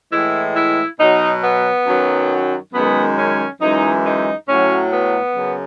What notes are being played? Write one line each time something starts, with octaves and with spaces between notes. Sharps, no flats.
A2 E3 G#3 E4
E4
B2 F#3 D#4
B3
F#2 D#3 F#3
F#2 D#3 G#3 B3
C#4
F#2 E3 G#3 D#4
D#4
A2 F#3 C#4
B3
F#2 C#3